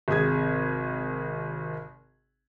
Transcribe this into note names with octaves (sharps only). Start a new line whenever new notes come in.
G#1 C3 G#4 G#6